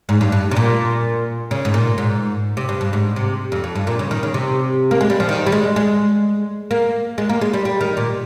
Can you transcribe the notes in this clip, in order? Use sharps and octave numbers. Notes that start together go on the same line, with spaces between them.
G#2
G2
G2
C3
A#2
C#3
G#2
A#2
G#2
C3
G2
G2
G#2
C3
F2
F2
G2
A#2
C#3
D#3
C#3
C3
A#3
G#3
G3
F3
D#3
G3
G#3
G#3
A#3
G#3
A#3
G#3
G3
G3
D#3
A#2